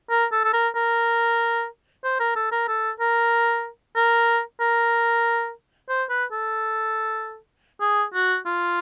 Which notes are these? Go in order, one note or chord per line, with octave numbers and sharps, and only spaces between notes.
A#4
A4
A4
A#4
A#4
C5
A#4
A4
A#4
A4
A#4
A#4
A#4
C5
B4
A4
G#4
F#4
F4